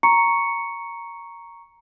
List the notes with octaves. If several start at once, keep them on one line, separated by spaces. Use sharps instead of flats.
A#5 C#6 C#7